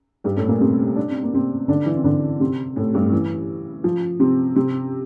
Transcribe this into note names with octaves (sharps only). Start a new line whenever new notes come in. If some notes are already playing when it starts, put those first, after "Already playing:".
G2 G3
A2 A3
A#2 A#3
C3 C4
D4
C4
A#3
C3 C4
D3 D4
E3 E4
C4
D3 D4
C3 C4
A2 A3
G2 G3
E3
F3
C3 C4
C3 C4